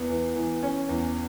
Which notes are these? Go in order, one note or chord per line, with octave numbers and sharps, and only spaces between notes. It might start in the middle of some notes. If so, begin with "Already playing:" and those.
Already playing: E2 B3
E3
E3
C#4
E2